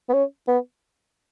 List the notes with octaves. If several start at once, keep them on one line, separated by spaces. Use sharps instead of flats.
B3
C#4
B3